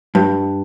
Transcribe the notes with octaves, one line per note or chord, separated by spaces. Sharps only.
G2